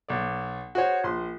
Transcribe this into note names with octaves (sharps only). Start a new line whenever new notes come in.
B1 D5
F#4 G#4 C5 C#5
A#1 C6